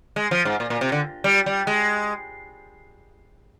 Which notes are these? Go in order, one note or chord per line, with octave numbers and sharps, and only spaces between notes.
G#3
F3
G#2
A#2
A#2
C3
D3
G3
G3
G#3